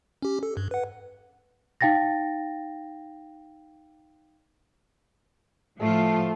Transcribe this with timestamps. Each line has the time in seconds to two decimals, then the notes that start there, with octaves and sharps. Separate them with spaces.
0.22 C#4 G4
0.43 A4
0.57 G2
0.71 B4 F#5
1.81 D#4 F5 G5 A6 A#6
5.80 A2 F3 A3 F4